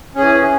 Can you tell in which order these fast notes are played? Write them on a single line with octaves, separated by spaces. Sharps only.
C#4 G#4 E3